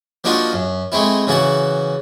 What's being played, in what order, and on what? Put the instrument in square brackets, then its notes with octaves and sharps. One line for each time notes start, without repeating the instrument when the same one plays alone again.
[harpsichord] F3 A#3 D4 D#4 F4 F#4
F#2
G#3 A3 C4 E4
C#3 E3 F#4 A5